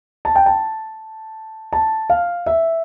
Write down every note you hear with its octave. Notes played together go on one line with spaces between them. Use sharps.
A5
G5
A5
A5
F5
E5